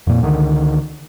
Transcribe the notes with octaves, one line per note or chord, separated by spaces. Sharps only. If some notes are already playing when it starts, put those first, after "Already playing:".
F2 A#2
C#2 D3 D#3